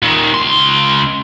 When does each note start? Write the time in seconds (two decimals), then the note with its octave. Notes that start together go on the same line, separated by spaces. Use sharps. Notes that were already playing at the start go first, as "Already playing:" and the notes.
0.03 A#2 D#3
0.34 C#2 C6